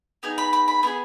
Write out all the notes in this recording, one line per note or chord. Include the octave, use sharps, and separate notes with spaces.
B3 D#4 G#4
B5
B5
B5
B3 D#4 G#4